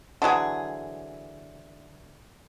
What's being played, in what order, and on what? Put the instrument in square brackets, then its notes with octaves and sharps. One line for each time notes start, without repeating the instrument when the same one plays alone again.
[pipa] D3 E3 F#3 G#4